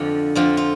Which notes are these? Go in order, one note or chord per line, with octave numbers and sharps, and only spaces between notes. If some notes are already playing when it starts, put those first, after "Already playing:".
Already playing: F2 D3 F3 D4
F2 D3 F3 F4
F4